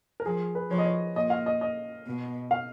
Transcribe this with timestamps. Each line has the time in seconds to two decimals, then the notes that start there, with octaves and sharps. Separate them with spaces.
0.20 A#4
0.26 F3 G#4
0.55 B4
0.70 F3 C#5
0.78 D#5
0.85 C#5
1.16 A#2 D#5
1.30 F5
1.46 D#5
1.61 D#5
2.06 B2
2.51 F5